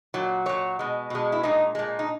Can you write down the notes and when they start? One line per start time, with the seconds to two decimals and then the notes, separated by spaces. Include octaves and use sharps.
0.14 A#2 F#3
0.46 A#2 F#3 C#5
0.79 B2 G#3
1.10 B2 G#3
1.32 E4
1.43 A#2 G#3 D#4
1.75 A#2 G#3
1.99 D#4